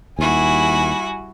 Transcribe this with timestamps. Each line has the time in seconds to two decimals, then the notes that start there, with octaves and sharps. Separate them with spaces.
0.19 D#2 G3 E4 F#4 G#5